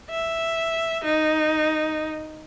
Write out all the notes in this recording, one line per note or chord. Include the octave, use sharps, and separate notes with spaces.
E5
D#4